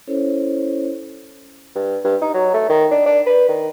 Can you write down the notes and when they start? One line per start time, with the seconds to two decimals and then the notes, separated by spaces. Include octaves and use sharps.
0.07 C#4 E4 A4 C5 C#5
1.75 G2
2.04 G2
2.21 D#4
2.34 F#3
2.54 A3
2.69 D#3
2.91 D4
3.06 D4
3.26 B4
3.48 D#3